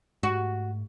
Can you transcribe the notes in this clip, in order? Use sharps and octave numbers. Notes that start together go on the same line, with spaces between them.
G#2 A3 F#4